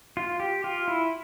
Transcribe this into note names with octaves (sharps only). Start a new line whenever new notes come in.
F4
G4
F4
E4